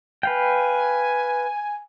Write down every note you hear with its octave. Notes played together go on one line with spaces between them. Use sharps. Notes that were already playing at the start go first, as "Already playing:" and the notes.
B4 F5 G5 G#5